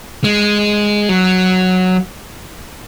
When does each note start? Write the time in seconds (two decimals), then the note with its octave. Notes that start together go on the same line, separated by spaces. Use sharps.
0.24 G#3
1.09 F#3